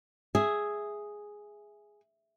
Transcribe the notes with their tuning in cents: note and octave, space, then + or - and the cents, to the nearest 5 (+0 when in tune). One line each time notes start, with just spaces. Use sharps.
G#4 +0 E5 +0